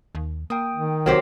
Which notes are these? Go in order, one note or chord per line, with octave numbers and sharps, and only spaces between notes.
D#2
A#3 G5 D#6
D#3
C2 F#3 C4 G4 A#4 C#5